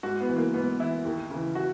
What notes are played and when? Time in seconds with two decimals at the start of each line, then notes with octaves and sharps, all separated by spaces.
0.03 G#2 F#4
0.20 B3
0.29 E3
0.37 A#3
0.53 G#2 B3
0.80 E3 E4
1.05 D#2
1.30 C#3 E3
1.55 F#4